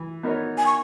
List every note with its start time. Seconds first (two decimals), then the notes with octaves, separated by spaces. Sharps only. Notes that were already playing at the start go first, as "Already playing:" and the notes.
Already playing: E3
0.23 B3 D#4 A#4 C#5
0.58 G#5
0.66 C#6